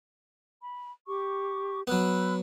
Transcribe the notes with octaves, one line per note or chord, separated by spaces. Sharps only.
B5
G4 C#6 D6
F#3 B3 B5 E6 F#6